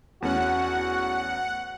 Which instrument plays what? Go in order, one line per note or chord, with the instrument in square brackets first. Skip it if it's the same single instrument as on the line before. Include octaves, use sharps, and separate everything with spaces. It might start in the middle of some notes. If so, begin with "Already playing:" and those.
[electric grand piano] E2 A3 C#4 [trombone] F#4 [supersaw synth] F#5